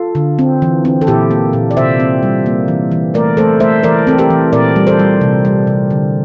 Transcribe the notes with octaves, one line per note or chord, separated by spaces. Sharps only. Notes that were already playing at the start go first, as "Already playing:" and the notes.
Already playing: F4 A4
D3
C4
E3
C4
A4
A#2 E4 G4
A#3
A#2
D5
C3 C5 E5
C4
G3
A#3
E3
E3
A3 A#4 D5
A3 A4 C5
A3 C5 E5
E3 A#4 D5
C4 A4
G4 A#4
E3
A#2 A#4 D5
G3
A4 C5
G3
C3
G3
C3
D3